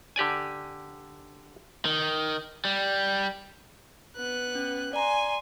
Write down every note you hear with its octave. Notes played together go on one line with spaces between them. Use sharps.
D3 G4 D5 G#5
D#3
G3
B3 F#6
C#4
D5 G#5 A#5 C6